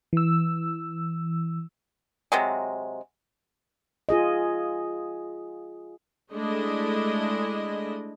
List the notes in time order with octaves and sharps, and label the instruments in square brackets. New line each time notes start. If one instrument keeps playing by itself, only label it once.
[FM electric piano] E3 E6
[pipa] C3 F#3 G#3
[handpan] F4 G#4 D#5
[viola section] G#3 A3 D4 E4 D#5